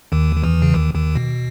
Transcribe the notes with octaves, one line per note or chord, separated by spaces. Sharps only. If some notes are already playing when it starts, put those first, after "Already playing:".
D#2 D#3
D#3
E2 E3
C#3
D#2 D#3
D#2 D#3
B2